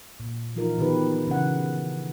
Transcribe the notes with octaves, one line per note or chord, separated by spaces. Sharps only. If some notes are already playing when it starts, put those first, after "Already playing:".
A#2
E3 F3 D#4 F4 A#4
B2 D#3 E3 G4 B4
C#3 E3 C#4 F#5